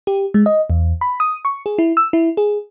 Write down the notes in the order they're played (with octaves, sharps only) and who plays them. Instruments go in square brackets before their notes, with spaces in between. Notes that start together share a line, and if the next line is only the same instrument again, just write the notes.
[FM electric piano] G4
G#3
D#5
E2
B5
D#6
C#6
G#4
E4
E6
E4
G#4